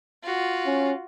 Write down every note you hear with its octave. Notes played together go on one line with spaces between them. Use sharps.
F4 F#4
C#4